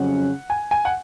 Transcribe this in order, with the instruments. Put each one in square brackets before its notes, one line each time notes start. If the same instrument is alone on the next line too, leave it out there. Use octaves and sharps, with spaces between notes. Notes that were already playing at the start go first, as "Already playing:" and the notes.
Already playing: [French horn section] F2 C#3 F#3 C#4 [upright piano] F#5
[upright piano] G#5
G#5
F#5